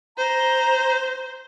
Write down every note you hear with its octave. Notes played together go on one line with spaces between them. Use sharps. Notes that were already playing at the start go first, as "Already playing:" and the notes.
C5 A#5